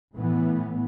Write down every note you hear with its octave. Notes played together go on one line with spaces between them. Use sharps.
A2 E3 B3